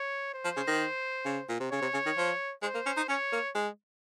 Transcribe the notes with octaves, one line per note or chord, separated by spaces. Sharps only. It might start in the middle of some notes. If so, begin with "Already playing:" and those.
Already playing: C#5
C5
F3
C#3
D#3
C#3
A#2
C3
C#3 C#5
C3
C#3
D#3
F3
G#3 C5
A#3
C#4
D#4
C#4 C#5
A#3
G#3